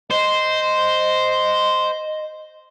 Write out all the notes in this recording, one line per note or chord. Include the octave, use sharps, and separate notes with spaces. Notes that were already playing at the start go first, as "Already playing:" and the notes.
C5 D#5